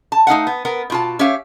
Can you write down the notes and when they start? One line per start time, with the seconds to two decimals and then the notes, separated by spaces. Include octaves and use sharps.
0.12 A5
0.27 A3 D#4 F5 F#5
0.47 B3
0.65 B3 A#4
0.90 B2 F4 A5
1.19 C#4 G4 C#5 E5 F5